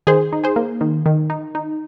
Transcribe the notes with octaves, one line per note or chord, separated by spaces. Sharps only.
D#3 G#4 C5
D#4
G#4 C5
A#3
D#3
D#3
D#4
D#4